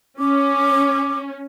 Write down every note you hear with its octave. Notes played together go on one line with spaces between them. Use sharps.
C#4 D6